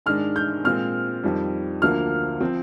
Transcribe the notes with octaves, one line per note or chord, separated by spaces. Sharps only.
G#2 D#3 G#3 D4 F6
G6
A#2 G#3 C4 F6
F2 D#3 G3
D2 D3 F3 A#3 F6
F3 C4